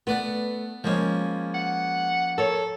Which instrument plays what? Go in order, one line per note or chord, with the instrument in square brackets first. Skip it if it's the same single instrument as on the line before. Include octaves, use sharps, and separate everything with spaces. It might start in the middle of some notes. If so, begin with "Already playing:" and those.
[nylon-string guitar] A3 B4 [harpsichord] B3 D5 F#5
[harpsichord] F3 A#3 C#4 [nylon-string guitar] G#3 D#5
[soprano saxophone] F#5
[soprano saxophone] A4 [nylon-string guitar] A#4 C#5